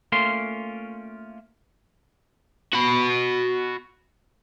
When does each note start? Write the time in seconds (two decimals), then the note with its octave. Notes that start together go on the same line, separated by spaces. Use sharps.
0.12 A3 A#3 C#4 F4 C6
2.73 F#4 B5